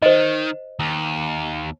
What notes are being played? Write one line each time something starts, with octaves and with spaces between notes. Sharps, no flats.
D#3 C5 D#5
D#2